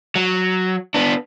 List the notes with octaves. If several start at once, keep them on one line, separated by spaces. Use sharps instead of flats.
F#3
B3 D4